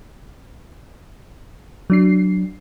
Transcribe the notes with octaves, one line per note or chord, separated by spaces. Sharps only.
F#3 D4 C7